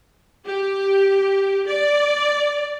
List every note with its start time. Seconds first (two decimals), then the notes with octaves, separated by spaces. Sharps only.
0.45 G4
1.68 D5